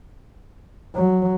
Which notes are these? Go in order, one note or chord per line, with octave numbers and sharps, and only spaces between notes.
F#3